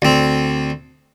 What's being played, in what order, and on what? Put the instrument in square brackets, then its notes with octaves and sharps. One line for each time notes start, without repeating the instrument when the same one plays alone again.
[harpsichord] D2 C4